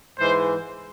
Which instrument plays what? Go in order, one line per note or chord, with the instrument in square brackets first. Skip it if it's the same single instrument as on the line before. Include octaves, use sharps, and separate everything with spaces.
[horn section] G#2 E3 G#3 C5